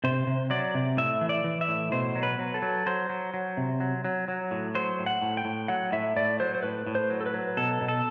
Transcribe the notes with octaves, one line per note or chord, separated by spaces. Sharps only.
C3 C5
C3
F#3 D5
C3
A2 E5
E3
D5
E3
E5
A2
B2 C5
F#3
B4
F#3
A4
F#3
F#3 C5
F#3
F#3
C3
F#3
F#3
F#3
A2
F#3 C5
A2
F#5
A2
G5
A2
F#3 F#5
A2 E5
A2 D5
F#3 C5
C5
A2 B4
A2
C5
F#3
A4
B4
F#3
B2 A4
B2
A4